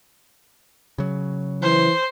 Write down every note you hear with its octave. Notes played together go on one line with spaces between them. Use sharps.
C#3 F#3
E3 C5